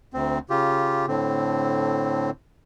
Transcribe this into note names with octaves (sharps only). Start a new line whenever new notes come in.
D2 C4
C#3 F4 G4
A2 D3 C4